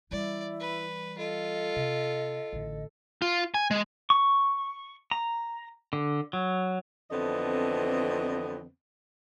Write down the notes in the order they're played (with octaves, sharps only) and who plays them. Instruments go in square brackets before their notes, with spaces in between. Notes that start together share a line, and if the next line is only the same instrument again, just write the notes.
[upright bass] E3 G3 [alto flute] E4 [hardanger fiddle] D5
[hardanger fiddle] B4
[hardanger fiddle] F4 [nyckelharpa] A4 [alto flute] D#5
[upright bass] C3
A1 D3
[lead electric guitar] F4
G#5
G#3
[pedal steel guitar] C#6
A#5
D3
F#3
[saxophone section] F2 D3 E3 B3 C4 D#5